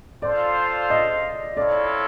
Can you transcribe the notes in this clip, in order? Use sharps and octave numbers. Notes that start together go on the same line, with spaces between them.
F4 A4 C5 D5 F5
D#5
C4 E4 A4 C#5 D5 F5